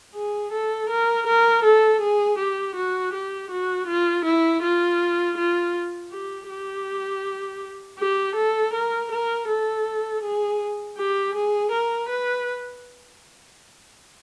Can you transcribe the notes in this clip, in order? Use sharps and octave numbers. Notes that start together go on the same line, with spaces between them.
G#4
A4
A#4
A#4
A4
G#4
G4
F#4
G4
F#4
F4
E4
F4
F4
G4
G4
G4
A4
A#4
A#4
A4
G#4
G4
G#4
A#4
B4